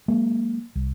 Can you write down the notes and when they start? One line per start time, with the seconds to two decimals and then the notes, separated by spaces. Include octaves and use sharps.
0.08 F#3 G#3 A#3
0.75 C2